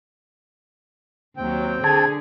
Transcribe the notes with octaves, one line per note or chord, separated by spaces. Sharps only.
D#2 F#3 C4 G5
D3 G#4 A5 G#6